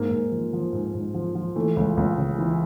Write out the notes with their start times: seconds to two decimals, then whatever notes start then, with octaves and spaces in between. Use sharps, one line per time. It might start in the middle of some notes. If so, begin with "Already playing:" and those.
Already playing: G#2 A#3
0.11 G#2
0.32 F3
0.53 F3
0.73 G#2
0.94 G#2
1.14 F3
1.35 F3
1.56 E3 A3
1.76 C#2
1.97 C#2
2.18 C#3
2.38 E3